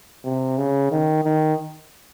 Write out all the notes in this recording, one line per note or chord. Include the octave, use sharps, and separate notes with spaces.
C3
C#3
D#3
D#3